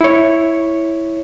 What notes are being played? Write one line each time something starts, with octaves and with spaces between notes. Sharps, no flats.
E4 C#5